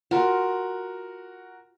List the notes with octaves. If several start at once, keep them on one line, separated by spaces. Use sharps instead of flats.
F4 F#4 A#4 F#5